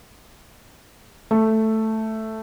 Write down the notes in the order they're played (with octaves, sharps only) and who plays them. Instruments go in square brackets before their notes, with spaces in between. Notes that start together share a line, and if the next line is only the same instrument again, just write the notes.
[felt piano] A3